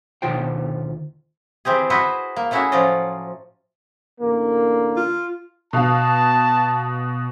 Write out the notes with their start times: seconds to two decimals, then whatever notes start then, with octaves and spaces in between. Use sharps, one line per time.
0.22 D2 B2 D#3 F4 C5 G5
1.65 E3 C4 G4 G#4
1.90 E4 F#4 B4 C5 D#5 E5
2.36 A#3
2.51 A3 C#4 E4 F#4 G#4 E5
2.72 A2 F3 F#3 C#4 D5 D#5
4.21 A1 D3 A#3
4.96 F4
5.73 B2 F5 A5